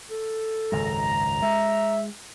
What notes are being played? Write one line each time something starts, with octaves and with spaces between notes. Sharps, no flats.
A4
G#1 C#2 F#2 A#5
G#3 E5